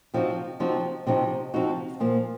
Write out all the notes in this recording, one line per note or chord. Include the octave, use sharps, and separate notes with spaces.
C3 F3 C4 D#4 F#4
C3 F3 C4 D#4 F#4
C3 F3 C4 D#4 F#4
C3 F3 C4 D#4 F#4
A#2 F3 A#3